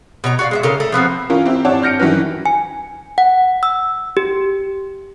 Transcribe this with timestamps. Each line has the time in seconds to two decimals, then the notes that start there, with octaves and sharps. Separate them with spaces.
0.24 B2 C#5 A#5
0.39 F#4 D5 F5
0.51 G#3 D5 E5
0.63 C#3 A4 A#4 F5
0.80 A3
0.92 F3 B3 C4 F#4
1.30 E3 C#4 F4 A#4
1.46 C4 E4 G4
1.65 C4 D4 C#5 D5 F#5 A5
1.82 F6 G6 A#6 C#7 D7
2.00 D#3 E3 F#3 C#4 B4
2.46 G#5
3.18 F#5
3.63 E6
4.17 G4